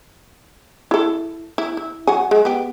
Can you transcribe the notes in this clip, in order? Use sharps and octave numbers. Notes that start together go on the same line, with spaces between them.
E4 A4
E4
E4
F#3 F#5 G#5
G#3
B3 G4